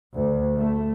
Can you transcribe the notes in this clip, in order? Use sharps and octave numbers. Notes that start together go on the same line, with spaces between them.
D2
A3